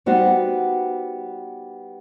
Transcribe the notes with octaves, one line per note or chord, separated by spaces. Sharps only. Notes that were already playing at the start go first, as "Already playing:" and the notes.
G3 B3 D#4 F#4 C5